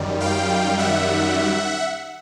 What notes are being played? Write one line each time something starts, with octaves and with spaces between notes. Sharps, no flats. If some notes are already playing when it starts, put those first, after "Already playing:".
Already playing: F#2 D#3 G3
F5 G5
E5 F#5